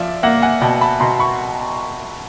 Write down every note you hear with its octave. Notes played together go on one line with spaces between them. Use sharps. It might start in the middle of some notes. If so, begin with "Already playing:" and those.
Already playing: F3 D5 E5
A#3 E5 F#5
F#5 G#5
B2 G5 A5
A5 B5
B2 A#5 C6
B5 C#6